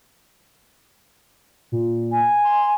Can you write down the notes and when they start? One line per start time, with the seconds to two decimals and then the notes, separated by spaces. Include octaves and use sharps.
1.72 A#2
2.11 G#5
2.44 C6